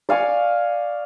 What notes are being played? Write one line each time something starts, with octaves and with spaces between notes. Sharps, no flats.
D5 F5 G#5 C#6